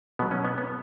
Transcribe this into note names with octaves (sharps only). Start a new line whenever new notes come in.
B2 F#3 B3
C#4
B3
B3